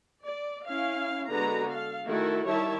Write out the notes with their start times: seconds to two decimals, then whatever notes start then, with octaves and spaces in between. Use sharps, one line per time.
0.25 D5
0.68 C#4 E4 F5
1.29 D3 G#3 B3 F#4 B4 A#5
1.71 A4 F5
2.06 D#3 A3 E4 F#4 A4
2.47 D#3 G3 E4 C#5 E5 A5